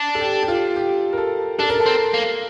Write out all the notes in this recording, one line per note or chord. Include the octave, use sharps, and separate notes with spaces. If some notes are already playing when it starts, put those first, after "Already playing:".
Already playing: D4
A4
G4
G4
F4
G4
A#4
A4
D4 A4
A#4
A4
C4
A#3